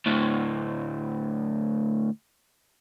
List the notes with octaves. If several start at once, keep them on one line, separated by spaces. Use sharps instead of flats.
D2 A2